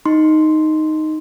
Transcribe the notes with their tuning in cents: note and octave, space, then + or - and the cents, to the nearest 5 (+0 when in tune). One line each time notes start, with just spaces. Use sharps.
D#4 +0 C6 +0